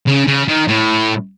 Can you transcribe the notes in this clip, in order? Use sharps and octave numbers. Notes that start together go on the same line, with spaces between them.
C#3
C#3
D#3
A2